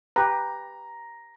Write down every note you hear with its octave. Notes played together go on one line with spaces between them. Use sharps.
G4 B4 A#5